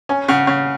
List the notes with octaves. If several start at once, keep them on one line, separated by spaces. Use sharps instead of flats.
C#4 G#5
C#3 F#5
C#3 F#5